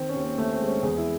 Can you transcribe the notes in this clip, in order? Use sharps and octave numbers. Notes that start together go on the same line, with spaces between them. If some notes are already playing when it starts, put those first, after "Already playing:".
Already playing: D#3 C4
C#4
D#2
C4
D#2 A3
C4
G#3
C#4
E2 G#4
E4